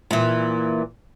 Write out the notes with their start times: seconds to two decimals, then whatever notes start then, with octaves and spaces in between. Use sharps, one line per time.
0.11 A#2 E3